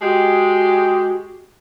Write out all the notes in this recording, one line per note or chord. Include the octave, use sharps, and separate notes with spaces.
G#3 F#4 G4